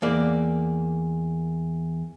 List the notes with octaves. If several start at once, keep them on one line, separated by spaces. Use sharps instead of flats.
E2 A#3 D5